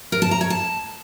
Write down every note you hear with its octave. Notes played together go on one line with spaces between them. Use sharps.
A#4
A5
A#5
C#5
A5